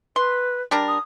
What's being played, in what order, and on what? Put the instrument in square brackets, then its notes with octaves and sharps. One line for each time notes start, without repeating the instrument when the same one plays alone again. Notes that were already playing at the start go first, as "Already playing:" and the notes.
[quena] B4 [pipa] C6
[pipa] G3 D4 A#4
[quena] D#6